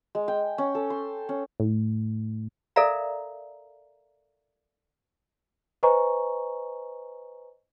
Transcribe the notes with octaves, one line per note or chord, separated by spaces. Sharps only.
G#3
G5
C#4
A4
C6
C#4
A2
A4 A#4 D5 E5 F5 A#5
B4 C5 D#5 G#5 A#5 C#6